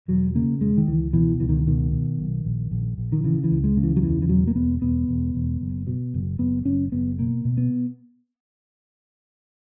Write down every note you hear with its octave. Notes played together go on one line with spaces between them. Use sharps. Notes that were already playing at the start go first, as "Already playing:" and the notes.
E1 F#3
C#3 A#3
E1 G#3
D#3
C#2 E3
B2 E3
C#2 E3
D#3
B2 D#3
B2
B1
A#1
A#1
A#1
D#3
C#3 E3
E3
C#2
G#3
C#3
E3
F#3
E2 E3
E3
E1 F#3
A#3
E1 B3
E1 B3
E1
E1
F#1
B2
F#1
F#1 B3
F#1 C#4
F#1 B3
B2 A#3
B2
B3